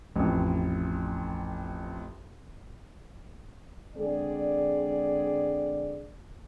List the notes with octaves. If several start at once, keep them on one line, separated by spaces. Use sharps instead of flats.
A1 F2
D3 G#3 C4 G#4 D5